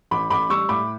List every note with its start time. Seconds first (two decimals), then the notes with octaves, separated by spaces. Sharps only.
0.11 A1 B5 D6
0.30 A1 B5 D6
0.50 G3 C#6 E6
0.69 A2 B5 D6